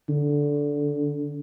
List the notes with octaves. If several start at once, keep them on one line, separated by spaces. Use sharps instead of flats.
D3